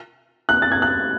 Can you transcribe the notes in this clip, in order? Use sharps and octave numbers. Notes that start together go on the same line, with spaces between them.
F#6
A6
G#6
F#6